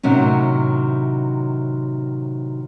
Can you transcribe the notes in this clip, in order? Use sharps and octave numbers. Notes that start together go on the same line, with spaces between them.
A2 C3 D#3 F#3 C#4